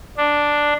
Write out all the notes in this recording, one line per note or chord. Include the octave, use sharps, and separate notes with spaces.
D4